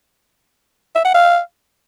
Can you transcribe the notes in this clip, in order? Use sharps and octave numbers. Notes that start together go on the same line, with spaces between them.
E5
F#5
F5